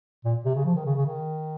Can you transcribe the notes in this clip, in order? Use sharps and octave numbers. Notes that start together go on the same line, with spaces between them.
A#2
C3
C#3
F3
D#3
C#3
C#3
D#3